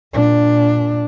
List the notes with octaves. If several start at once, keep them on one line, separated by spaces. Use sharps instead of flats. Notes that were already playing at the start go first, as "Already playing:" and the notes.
A#2 D4